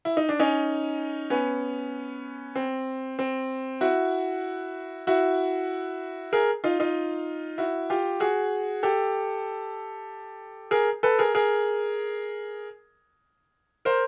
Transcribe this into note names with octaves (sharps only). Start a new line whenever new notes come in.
E4
D#4
D4
C#4 D#4
B3 C#4
C4
C4
E4 F#4
E4 F#4
G#4 A#4
D#4 F4
D#4 F4
E4 F#4
F4 G4
F#4 G#4
G4 A4
G#4 A#4
A4 B4
G#4 A#4
G#4 A#4
A#4 C5